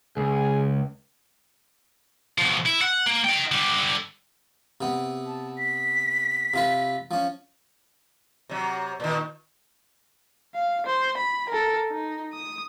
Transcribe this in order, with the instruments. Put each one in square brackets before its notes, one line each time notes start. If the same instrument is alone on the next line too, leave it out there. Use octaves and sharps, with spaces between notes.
[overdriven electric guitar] C#2 [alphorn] G#4
[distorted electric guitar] B2 F3
E4
F#5
A#3
D#5 G5
D3 G3
[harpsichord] C3 B3
[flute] A5
B6
[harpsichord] C3 F4 B4
F3 C#4
[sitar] C3 F#3
A#2 D#3
[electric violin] F5
C5
B5
A4 A#4
D#4
D#6